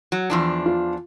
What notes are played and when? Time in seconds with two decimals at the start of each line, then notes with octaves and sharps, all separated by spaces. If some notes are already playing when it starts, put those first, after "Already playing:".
0.12 F#3
0.30 E2 F3 D4
0.66 F4